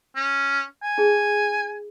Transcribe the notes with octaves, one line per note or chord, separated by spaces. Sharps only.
C#4
G#5
D#4 G#4